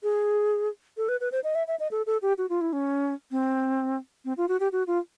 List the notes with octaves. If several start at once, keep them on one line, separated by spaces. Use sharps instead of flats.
G#4
A4
B4
B4
C5
D#5
E5
E5
D#5
A4
A4
G4
F#4
F4
E4
C#4
C4
C4
F4
F#4
G4
F#4
F4